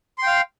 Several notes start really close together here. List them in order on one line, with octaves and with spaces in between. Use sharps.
C6 G5 F5